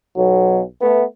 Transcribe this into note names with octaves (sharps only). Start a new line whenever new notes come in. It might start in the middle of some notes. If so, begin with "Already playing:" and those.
B1 F#3
A3 B3